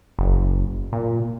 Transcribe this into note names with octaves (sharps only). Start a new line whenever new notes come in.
F#1
A#2